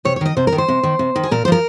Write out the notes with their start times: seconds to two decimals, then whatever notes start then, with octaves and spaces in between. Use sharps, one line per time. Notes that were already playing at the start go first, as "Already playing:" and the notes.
0.05 C3 C#5
0.16 C#5
0.21 D#3 D#5
0.37 C3 C5
0.47 A#4
0.52 D#3
0.58 C5
0.68 C3
0.83 D#3
0.99 C3
1.16 D#3
1.23 G#4
1.31 A#2 A#4
1.45 C5
1.48 F3 A#4